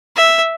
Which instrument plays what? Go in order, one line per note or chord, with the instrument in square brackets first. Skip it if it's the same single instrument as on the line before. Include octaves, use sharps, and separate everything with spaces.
[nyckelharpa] E5